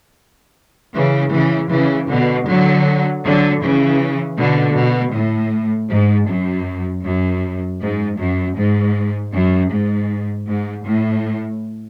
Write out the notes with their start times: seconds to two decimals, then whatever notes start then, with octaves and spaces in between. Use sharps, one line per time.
0.96 C#3 E3
1.33 C#3 E3
1.71 C#3 E3
2.09 B2 D3
2.48 D3 F#3
3.24 D3 F#3
3.62 C#3 E3
4.38 B2 D3
4.76 B2
5.14 A2
5.90 G#2
6.28 F#2
7.04 F#2
7.80 G#2
8.18 F#2
8.57 G#2
9.32 F#2
9.70 G#2
10.46 G#2
10.85 A2